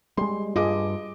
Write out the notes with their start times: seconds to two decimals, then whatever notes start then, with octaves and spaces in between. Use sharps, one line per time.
0.17 G3 G#3 C6
0.56 G2 F4 G#4 D#5 D6